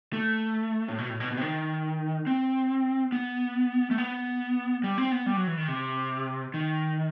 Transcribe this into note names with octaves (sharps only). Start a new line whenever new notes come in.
A3
A2
B2
A2
B2
B2
C3
D#3
C4
B3
A3
B3
G3
C4
B3
G3
F#3
E3
D#3
C3
D#3